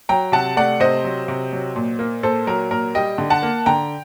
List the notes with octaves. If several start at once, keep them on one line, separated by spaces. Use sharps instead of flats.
F#3 G5 A#5
C3 F#5 A5
A3 D5 F#5
C3 C5 D#5
F#3
C3
F#3
A#2
A#3
A#2 A4 C5
F#3 A#4
A#2 A#4
G3 D#5 G5
D3
F#5 A5
A#3
D3 G5 A#5